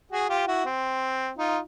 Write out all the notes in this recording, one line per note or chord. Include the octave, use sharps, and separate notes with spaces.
F#4 G#4
F4 G4
E4 F#4
C4
D#4 F4